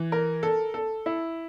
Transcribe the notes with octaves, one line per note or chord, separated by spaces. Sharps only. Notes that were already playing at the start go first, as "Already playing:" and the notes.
Already playing: E3
A#4
A4
A4
E4